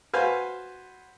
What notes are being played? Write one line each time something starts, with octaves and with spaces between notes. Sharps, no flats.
F#4 B4 C5 F5 G#5